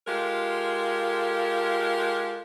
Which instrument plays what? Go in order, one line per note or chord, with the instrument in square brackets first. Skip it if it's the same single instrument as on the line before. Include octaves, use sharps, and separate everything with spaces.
[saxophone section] G#3 F4 G4 A4 A#4